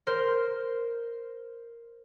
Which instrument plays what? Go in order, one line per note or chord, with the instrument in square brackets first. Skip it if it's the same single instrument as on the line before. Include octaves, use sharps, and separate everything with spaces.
[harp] A#4 C5